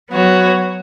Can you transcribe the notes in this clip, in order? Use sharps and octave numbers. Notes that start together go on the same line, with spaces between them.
F#3 B3 F#4 C#5